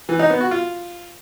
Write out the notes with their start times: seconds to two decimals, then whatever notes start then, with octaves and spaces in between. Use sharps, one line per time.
0.09 E3
0.19 D#4
0.30 B3
0.41 F#4
0.51 F4